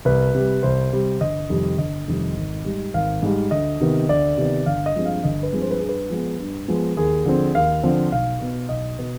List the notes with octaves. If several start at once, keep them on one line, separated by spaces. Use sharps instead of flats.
C2 B4
C3 G3
C2 C5
C3 G3
G1 D#5
F2 C3 D#3 G3
G1 D#5
F2 C3 D#3 G3
G#1
G#2 G3
G#1 F5
G#2 G3
D2 D#5
C3 D#3 B3
D2 D5
C3 D#3 B3
G1 F5
D#5
G2 F3 G#3 C4
F5
G1 D#5
B4
G2 F3 G#3 C4
C5
B4
G2 G#4
B4
F3 G#3 B3
G2
F3 G#3 B3
D#2 G#4
D3 F3 C4
D#2 F5
D3 F3 C4
B1 F5
B2 B3
B1 D#5
B2 B3